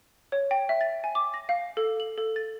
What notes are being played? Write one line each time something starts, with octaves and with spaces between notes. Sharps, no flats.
C#5
G5
E5
A6
G#5
D6
A#6
F5
A4
F#7
A4
A6